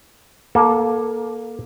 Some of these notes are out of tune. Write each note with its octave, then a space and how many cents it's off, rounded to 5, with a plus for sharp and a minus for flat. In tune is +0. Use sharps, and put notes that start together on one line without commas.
A#3 +15 A4 -10